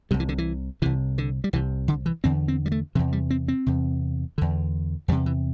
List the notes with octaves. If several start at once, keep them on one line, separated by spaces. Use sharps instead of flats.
C2 C3 G3
E3
D3
E3
C2 C3 E3
D3
G3
C2 C3 E3
D3
E3
E2 D3 C4
C4
G3
A3
E2 C3 E3
G3
C4
C4
E2 C3
E2 D3
E2 C3 G3
E3